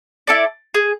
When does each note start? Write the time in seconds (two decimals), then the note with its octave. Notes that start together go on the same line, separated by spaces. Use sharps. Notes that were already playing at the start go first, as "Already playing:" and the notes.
0.27 E4 A4 D5
0.74 G#4